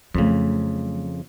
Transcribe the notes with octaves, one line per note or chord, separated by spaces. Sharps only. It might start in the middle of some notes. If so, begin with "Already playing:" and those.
F2 C#3 F#3 A3